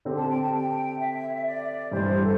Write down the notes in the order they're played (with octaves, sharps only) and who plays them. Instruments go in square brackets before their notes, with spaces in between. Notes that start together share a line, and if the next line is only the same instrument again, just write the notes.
[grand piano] D3 C4 G4
[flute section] A5
G5
A5
G5
E5
D5
[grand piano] G2 E3 G3 E4 [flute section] C5
[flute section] G4
A4